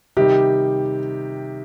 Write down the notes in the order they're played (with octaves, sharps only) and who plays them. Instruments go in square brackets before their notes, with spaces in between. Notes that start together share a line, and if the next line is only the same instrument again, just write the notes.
[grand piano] C3 D#3 G3 D#4 [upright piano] G4